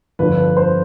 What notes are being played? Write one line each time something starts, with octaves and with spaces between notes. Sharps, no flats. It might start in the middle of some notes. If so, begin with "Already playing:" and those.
G1 F2 D3 F3 B4
B4
C5